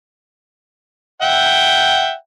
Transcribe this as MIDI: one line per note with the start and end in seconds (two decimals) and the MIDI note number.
1.22 2.14 76
1.22 2.14 78
1.22 2.14 79